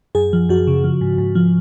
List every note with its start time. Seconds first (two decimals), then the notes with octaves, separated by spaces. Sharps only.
0.15 F#2 G#4
0.33 F3
0.49 F#2 F#4
0.67 C#3
0.84 F3
1.01 G#2
1.18 G#2
1.35 F3